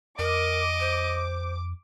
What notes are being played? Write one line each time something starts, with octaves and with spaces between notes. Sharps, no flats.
F2 A#4 D#5 D6
C5